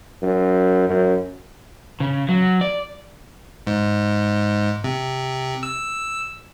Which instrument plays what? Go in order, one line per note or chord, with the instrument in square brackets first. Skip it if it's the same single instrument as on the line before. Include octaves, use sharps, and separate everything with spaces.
[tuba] F#2
F#2
[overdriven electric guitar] C#3
F#3
D5
[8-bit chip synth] G#2
C3
E6